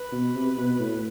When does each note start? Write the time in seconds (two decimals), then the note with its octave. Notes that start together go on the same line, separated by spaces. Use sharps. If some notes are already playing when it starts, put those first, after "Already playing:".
Already playing: B4
0.12 B2
0.35 C3
0.57 B2
0.79 A2